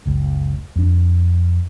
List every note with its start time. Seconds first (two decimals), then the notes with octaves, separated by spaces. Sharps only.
0.06 F#1 C#2
0.76 F2 D4